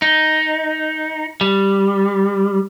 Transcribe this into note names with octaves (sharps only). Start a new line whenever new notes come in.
D#4
G3